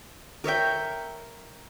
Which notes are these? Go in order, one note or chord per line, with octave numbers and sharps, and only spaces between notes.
A#4 C#5 E5 G5